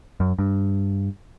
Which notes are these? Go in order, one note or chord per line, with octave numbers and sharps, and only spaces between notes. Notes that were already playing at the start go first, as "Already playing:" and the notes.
F#2
G2